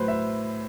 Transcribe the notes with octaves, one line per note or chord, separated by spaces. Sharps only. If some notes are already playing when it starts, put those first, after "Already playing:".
Already playing: A2 F#3 B4 C5
E5